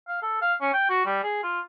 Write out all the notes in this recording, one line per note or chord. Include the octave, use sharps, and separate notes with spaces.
F5
A4
F5
C#4
G5
F#4
G3
G#4
F4